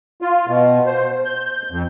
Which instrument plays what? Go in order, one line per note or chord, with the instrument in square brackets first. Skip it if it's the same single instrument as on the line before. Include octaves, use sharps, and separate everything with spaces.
[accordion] F4
B2
C5
G6
F2